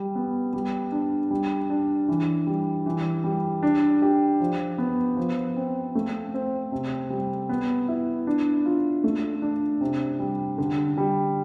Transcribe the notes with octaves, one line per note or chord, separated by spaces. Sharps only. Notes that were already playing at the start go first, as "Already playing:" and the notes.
Already playing: G3
B3
G3
D4
G3
D4
E3
G3
E3
G3
D4
G4
F3
B3
F3
C4
A3
C4
C3
G3
B3
E4
D4
F4
A3
D4
C3
G3
D3
G3